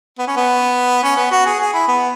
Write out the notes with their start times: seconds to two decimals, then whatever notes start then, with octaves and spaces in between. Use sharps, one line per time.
0.18 B3
0.27 C#4
0.37 B3
1.03 C#4
1.17 B3
1.31 F#4
1.46 G#4
1.60 G#4
1.73 E4
1.88 B3